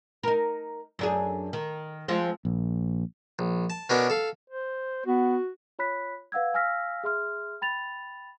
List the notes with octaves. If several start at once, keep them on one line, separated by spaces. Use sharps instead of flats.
D#4 A#4
F#2 D4 G#4
D#3
F3 G#3 C4
A#1
A#1
A5
B2 C#4 D4 A#4 D6
A4 F5
C5
B3 F#4
F4 C#5 B5 F#6 B6
B4 F5 F#5 E6 G#6
F5 G#5 E6 F6 A#6 B6
G#4 E5 C6 F6
G5 B5 A6 F7